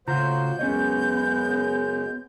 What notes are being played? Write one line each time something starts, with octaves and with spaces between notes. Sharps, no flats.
A2 C#3 F4 F#4 C5 F5 A#5 G6
F#2 C#3 G#3 B3 C#4 C#5 D#5